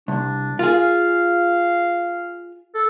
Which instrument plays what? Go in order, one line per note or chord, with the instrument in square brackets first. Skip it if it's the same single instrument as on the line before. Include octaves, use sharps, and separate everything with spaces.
[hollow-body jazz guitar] C2 [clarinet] D4
[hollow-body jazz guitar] F4 G#4 [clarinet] A#4
[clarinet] F5
A4